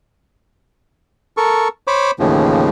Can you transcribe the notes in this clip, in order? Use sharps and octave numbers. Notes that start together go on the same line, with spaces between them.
A4 A#4 C#6
C5 C#5 B5 D6
D#2 A2 C#3 E3 F3